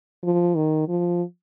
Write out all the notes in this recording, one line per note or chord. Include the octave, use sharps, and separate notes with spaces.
F3
D#3
F3